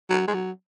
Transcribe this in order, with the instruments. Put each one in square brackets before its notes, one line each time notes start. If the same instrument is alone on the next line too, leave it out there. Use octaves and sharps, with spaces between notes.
[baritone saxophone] F#3
G#3
F#3